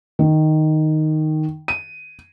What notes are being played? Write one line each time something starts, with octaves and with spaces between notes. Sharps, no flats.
D#3
D#7